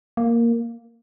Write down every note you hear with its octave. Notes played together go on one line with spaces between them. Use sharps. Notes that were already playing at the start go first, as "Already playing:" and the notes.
A#3